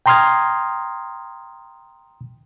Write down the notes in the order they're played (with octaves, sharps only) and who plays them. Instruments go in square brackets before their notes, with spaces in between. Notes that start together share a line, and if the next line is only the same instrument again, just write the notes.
[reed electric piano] G5 A#5 C6 D#6 F6 G#6